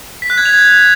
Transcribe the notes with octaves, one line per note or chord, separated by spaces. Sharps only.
B6
F#6
G#6
F7
G#6